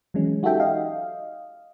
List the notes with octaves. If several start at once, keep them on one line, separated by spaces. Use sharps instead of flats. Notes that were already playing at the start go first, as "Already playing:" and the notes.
E3 F#3 G#3 C#4
D#4 F#4 G4 A4 E5 G5
D#5 F5